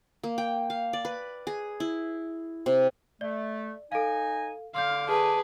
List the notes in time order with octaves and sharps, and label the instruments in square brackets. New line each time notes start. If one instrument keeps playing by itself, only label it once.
[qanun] A#3
G5
F5
D5
B4
G#4
E4
C3
[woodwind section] A3 [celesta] D5
[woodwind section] D#4 G#5 [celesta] A4 F5
[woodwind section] D3 D6 [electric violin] F5 [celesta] C6 F6 G6
[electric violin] G#4 B4 [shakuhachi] A5